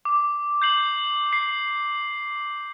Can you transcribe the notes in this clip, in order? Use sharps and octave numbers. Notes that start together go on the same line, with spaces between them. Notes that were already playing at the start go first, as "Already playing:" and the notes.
D6
G6 C7 F#7
C7